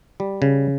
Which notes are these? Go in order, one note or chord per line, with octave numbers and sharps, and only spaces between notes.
G3
C#3